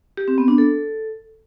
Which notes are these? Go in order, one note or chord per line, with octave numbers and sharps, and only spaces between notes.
G4
C4
B3
D4
A4